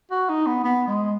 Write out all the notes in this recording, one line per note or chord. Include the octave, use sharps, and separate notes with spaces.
F#4
D#4
B3
B3
G#3